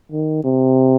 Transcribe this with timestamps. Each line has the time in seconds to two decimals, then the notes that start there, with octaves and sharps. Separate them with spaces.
0.12 D#3
0.44 C3